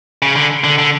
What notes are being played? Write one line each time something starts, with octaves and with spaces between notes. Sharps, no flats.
C#3
D3
D3
D3